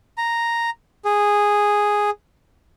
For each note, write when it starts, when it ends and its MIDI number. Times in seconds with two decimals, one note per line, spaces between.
0.18 0.70 82
1.05 2.10 68